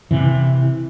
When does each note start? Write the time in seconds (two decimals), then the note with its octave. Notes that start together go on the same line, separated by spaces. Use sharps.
0.11 C3 E3